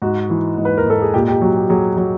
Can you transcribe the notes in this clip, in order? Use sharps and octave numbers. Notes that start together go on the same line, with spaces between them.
G#2 F#4
E3
G#2
B4
A#4
G#2 A4
G#4
A#2 G4
G4
F#3 F#4
G4
F#3 G#4
F#3